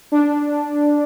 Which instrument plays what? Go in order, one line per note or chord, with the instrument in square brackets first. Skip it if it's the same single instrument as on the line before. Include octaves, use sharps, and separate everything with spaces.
[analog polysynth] D4